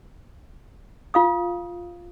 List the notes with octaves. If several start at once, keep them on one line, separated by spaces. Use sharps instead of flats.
F4 F5 D#6